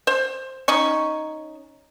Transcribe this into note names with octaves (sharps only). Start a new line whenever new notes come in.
C5
C#4 D#4 C#6